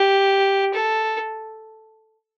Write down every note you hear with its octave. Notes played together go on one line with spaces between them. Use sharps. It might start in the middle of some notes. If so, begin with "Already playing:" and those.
Already playing: G4
A4